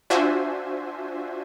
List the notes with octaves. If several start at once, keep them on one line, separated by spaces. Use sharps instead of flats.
D4 F4 F#4 C5 E5 G#5